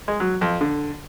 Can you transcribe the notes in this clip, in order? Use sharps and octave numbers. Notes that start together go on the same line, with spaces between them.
G#3
F#3
F2
D3